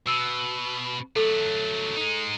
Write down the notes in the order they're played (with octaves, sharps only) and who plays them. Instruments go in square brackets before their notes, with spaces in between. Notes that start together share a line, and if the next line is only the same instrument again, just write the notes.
[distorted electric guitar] B2 [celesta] E6
[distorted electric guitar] F#3 A3 [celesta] A4
[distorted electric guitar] G#3 D#4